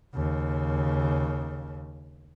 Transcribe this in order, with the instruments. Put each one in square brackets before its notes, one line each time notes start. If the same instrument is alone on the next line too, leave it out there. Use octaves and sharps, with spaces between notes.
[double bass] D#2 C#3